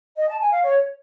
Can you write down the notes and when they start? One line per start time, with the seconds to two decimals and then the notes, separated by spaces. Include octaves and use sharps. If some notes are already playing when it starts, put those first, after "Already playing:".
0.17 D#5
0.29 A5
0.40 G#5
0.51 F5
0.63 C#5